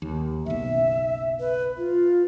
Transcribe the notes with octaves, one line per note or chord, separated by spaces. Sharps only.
D#2
F#1 B1 E5
B4
F4